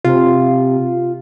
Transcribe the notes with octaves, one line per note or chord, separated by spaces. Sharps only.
C3 F4